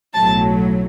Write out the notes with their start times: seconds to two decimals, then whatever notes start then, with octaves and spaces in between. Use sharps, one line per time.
0.14 B1 A2 F#3 A5